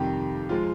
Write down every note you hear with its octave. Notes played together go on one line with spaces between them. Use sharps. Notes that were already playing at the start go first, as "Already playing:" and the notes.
Already playing: F2 C3 D#3 G3 G4
F3 G#3 F4